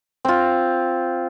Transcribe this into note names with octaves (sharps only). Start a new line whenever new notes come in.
C4 F4